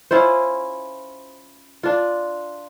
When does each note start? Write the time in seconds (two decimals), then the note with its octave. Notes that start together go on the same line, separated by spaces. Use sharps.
0.11 C#4 E4 F4 C5
1.83 D4 F4